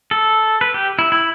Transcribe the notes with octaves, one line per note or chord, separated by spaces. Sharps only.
A4
B4
G4
E4
E4